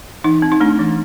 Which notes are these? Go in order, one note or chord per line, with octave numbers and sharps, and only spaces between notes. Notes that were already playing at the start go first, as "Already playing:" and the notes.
E3 D#4
C4
D#4
A3 D4
E3